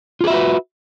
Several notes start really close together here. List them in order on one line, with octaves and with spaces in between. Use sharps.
F4 G#4 E5 F#4 B4